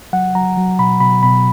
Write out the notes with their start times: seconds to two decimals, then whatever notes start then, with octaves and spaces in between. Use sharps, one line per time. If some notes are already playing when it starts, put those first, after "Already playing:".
0.13 F#3 F#5
0.35 F#3 A#5
0.57 F#3
0.79 B2 B5
1.00 B2 B5
1.23 B2 B5